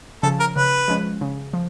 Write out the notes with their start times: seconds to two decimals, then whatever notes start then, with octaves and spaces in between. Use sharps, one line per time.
0.23 C#3 F3 A4
0.40 A#4
0.56 C#3 B4
0.88 F3 G#3 C#4
1.21 C#3
1.53 F3